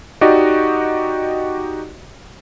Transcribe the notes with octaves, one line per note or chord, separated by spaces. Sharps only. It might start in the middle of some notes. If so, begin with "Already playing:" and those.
D#4 F#4 G4 D5 D#5